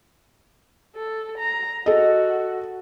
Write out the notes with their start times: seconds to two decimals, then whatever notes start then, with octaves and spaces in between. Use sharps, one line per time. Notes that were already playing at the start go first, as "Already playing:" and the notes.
0.95 A4
1.38 A#5
1.86 F#4 A4 D#5